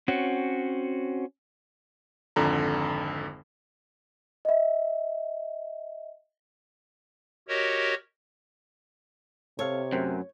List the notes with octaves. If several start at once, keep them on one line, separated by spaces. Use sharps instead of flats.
C4 C#4 F#4
G#1 F2 D3 A#5
D#5 E5
F#4 G4 A#4 C#5 D#5
C3 C4 A4 C#5 F5
F#2 A3 C4 A#4